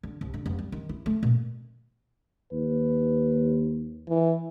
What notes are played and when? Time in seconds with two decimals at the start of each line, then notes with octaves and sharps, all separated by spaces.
0.03 D3
0.21 C2
0.34 D3
0.46 F1
0.59 G3
0.72 D#3
0.89 E4
1.06 A3
1.23 A#2
2.53 D#2 B4
4.09 E3